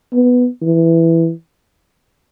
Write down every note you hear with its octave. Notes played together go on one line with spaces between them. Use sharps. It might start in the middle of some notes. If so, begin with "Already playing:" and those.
B3
E3